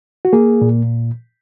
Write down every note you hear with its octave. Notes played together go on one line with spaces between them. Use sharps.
F#4
A#3 G#4
A#2